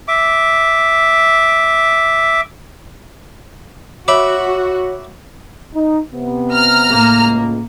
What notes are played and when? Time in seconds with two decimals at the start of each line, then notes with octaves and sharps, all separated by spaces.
0.08 E5 D6
4.08 F#4 C#5 E5 B5 D6
5.74 D#4
6.13 C3 B3
6.52 A#5 F6
6.88 A2 A#3
7.17 C#2